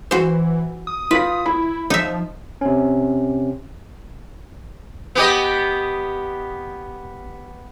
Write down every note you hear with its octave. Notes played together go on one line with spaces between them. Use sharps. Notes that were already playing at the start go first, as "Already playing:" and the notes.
E3 F#4 C5
D#6
F4 B4 B6
E4 B5
F3 D#4 E5
C3 C#4
B3 G4 D#5